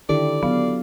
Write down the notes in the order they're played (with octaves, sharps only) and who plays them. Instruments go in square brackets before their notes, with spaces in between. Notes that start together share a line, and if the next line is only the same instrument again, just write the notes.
[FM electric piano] D3 D#3 A4 [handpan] D4 E4 G4 [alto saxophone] D5
[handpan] F#3 F5 [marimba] B3